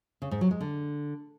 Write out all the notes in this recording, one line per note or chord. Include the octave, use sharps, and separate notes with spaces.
C#3
G#2
F#3
G#3
D3